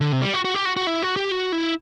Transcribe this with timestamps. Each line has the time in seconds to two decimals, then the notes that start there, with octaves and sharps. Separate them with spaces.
0.01 D3
0.12 C3
0.22 G3
0.34 F#4
0.45 F#4
0.54 G4
0.65 F#4
0.77 F#4
0.87 E4
1.02 F#4
1.16 G4
1.31 F#4
1.52 E4